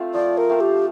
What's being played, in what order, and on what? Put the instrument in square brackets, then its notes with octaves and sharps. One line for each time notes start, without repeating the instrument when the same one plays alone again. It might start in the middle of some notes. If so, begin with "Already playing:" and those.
Already playing: [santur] A3 C4 F4
[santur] F3 [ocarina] D5
[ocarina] A#4
[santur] A3 C4 F4
[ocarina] G4